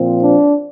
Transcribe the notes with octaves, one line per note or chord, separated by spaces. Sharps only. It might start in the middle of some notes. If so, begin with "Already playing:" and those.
Already playing: A#2 F3 C4
D4